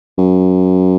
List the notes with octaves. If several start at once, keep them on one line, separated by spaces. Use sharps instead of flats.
F#2